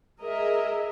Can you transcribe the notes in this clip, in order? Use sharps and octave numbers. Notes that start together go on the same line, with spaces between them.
G#4 A#4 D#5 E5